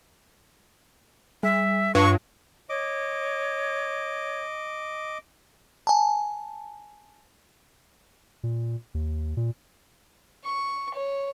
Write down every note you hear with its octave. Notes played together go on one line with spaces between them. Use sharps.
G3 E5
G2 F4 C#5 C#6
C#5 D#5 D6
G#5 A5
A#2
D#2
A#2
C#6
C#5